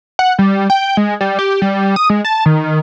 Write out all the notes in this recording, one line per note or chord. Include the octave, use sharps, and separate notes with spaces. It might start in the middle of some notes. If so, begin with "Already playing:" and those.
F#5
G3
G5
G#3
G3
G4
G3
D#6
G#3
A5
D#3